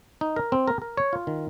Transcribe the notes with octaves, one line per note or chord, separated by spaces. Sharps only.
D#4
A#4
C4
A#4
A#4
C#5
F4
D#3